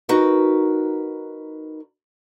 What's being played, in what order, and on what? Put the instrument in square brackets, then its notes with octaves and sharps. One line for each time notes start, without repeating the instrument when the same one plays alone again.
[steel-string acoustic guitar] D#4 F#4 A#4 B4